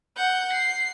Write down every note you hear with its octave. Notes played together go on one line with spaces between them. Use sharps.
F#5 G6
C7